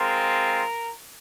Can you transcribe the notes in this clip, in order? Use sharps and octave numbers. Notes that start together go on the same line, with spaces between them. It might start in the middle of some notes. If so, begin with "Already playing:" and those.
Already playing: G#3 C4 F4 A#4